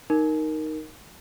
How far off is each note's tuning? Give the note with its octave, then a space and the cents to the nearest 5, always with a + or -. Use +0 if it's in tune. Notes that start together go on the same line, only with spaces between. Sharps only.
D#4 +0 A#4 +0